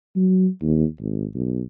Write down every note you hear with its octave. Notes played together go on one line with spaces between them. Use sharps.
F#3
D#2
G#1
B1